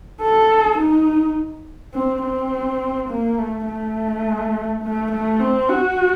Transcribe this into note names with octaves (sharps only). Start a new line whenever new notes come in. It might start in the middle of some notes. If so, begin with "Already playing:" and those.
A4
D#4
C4
C4
A#3
A3
A3
A3
A3
C4
F#4